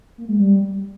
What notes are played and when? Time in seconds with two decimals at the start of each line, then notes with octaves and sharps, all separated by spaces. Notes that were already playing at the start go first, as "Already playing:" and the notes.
0.18 A#3
0.28 G#3
0.39 G3